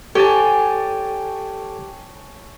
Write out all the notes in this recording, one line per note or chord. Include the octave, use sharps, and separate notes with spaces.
G4 A4 C#5 G#5 A5